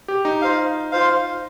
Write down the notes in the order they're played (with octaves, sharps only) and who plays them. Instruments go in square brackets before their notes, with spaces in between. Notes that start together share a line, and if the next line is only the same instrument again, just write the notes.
[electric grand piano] G4
D#4
[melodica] F4 C5 F5
F4 C5 F5